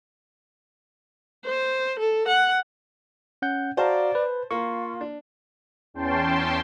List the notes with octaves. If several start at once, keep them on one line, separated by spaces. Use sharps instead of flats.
C5
A4
F#5
C#4 F#5 G6
F#4 C5 D5 F5 A5 A#5
B4
A#3 F4 C#6
D4
E2 C#4 G5 A5 C6